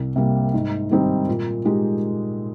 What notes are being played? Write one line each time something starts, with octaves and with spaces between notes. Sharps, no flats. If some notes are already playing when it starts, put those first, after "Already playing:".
Already playing: C2
C3 G3 A#3
G#2
D#3 G3 C4 D#4
A#2
G#3 D#4 G4